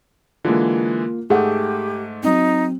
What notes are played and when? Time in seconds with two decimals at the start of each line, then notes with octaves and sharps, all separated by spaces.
0.44 D3 E3 G#3 A#3 F4
1.30 G#2 A3 G4 G#4 F#5
2.23 F#3 C4 D#4